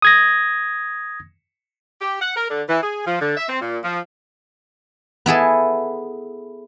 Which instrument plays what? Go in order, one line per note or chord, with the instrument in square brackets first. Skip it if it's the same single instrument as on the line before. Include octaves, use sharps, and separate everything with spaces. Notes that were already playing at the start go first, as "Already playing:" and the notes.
[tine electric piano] D#6 G#6 A#6
[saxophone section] G4
F#5
A#4
D3
E3
G#4
F3
D3
E5
C4
A#2
F3
[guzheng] B3 E4 G#4 A4